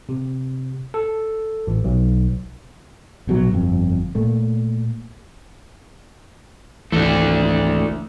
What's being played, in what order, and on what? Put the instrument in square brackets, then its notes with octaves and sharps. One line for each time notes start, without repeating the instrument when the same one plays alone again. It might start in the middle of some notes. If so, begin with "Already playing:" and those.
[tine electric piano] C3
A4
A1
B1
[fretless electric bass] A#1 B2 F#3
G1 F2
A#2 A3
[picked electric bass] G#1 C#2 E3 [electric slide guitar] A3 D4